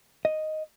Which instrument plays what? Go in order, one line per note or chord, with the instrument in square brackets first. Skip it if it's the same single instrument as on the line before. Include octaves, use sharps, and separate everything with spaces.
[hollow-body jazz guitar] D#5